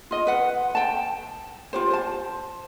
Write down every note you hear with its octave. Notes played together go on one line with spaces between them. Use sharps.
F4 D#5
B4 F#5
G5 A5
F4 G4 C5
C5 A5